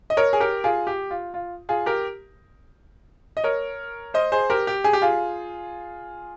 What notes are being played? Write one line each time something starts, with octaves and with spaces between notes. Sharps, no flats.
D#5
A#4 C#5
G#4
G4 A#4
F4 G#4
G4
F4
F4
F4 G#4
G4 A#4
D#5
A#4 C#5
C5 D#5
G#4 C5
G4 A#4
G4
G#4
G4
F4 G#4